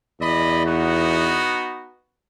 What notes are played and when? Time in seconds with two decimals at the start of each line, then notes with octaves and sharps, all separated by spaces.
0.20 E2 D5 D#5 B5
0.65 B3 D#4 F#4